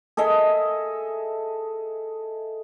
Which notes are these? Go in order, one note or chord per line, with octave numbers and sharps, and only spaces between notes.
G#4 A4 D#5 E5